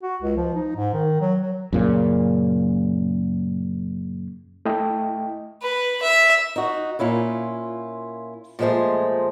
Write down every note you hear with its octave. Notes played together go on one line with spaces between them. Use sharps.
F#4
C#2
F3
D#4
G#2
D#3
F#3
F#3
F#2 A#2 C#3
A3 E4 D#5 G5
B4
E5
D#4 F#4
A#2 C#4 E4 F4
A#2 F3 G#3 A3 C5 A5